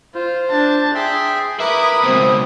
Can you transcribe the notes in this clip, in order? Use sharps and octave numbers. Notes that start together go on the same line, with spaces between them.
F4 C5
D4 A5
G#4 E5 G5 C6
E4 A#4 B4 B5 D6 D#6
C#2 B2 C4